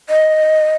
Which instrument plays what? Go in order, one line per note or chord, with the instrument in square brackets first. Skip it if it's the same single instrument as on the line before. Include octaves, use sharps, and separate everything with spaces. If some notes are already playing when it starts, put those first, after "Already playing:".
[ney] D#5